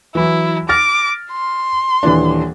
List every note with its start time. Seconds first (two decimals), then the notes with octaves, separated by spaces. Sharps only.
0.15 E3 F#3 E4
0.69 D6 F6 A6 A#6
1.31 C6
2.03 D#1 E3 D4